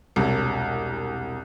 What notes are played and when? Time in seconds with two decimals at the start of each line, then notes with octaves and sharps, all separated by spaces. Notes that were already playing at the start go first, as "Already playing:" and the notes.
0.16 E1 C2